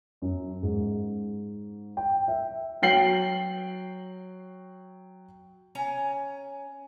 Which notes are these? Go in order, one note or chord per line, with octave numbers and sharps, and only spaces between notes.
F#2
G#2
G5
E5
F#3 G5 C7 F#7
C#4 G#5 A#5